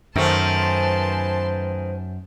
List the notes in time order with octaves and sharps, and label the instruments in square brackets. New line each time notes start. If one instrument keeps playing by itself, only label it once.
[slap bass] F#2 [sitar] D#3 A3 [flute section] B4 C5 G#5 [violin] A5 C6